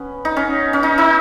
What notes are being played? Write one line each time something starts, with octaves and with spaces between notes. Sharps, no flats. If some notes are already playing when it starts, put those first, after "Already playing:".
Already playing: B3 C#4
D#4
C#4
C#4
D#4
D#4